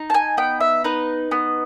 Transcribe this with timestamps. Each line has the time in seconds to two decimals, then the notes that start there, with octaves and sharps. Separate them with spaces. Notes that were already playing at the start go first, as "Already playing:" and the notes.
Already playing: D#4
0.10 A5
0.14 G#5
0.37 B3 G5
0.60 E5
0.84 D#4 B4
1.31 B3